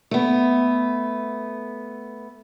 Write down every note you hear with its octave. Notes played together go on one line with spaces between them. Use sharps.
A3 B3